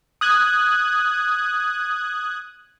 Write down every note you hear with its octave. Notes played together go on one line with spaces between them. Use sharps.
D#6 F#6 G#6